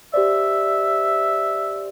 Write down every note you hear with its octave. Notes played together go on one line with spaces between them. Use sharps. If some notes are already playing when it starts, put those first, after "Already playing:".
G4 C5 D5 E5